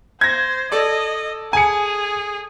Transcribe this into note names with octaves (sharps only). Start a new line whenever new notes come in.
C5 G#6 A#6
A4 D5 D#5
G#4 G#5 C#7